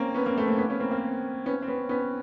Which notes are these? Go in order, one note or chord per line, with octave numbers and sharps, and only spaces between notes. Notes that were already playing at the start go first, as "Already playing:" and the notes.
Already playing: A#3 C4 C#4
B3 C#4
A#3 C4
A3 B3
A#3 C4
B3 C#4
B3 C#4
A#3 C4
A#3 C4
B3 C#4
C4
B3 C#4
B3 C#4